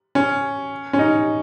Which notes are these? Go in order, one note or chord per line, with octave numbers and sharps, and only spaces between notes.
C#4
C#4
D#4